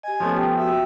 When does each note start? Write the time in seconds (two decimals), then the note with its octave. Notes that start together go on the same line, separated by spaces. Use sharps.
0.03 G4 D#5 G#5
0.20 F3 A3 B3 C#4 G4 C#5
0.36 G4 G5 A5
0.57 F#4 E5 G5